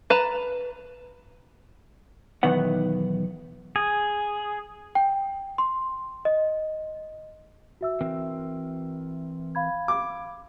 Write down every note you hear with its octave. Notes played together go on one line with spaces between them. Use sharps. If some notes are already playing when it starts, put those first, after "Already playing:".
B4 A5 A#5
B1 E2 D#3 B3 F#5
G#4
G5
C6
D#5
F#4 E5 E6
E3 C4 A#4
F5 B5 G#6
D6